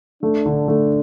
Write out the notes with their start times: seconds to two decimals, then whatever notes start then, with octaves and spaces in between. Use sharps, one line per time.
0.22 A3 D4
0.46 D3
0.68 A3